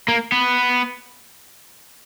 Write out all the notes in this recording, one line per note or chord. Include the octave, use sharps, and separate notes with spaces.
A#3
B3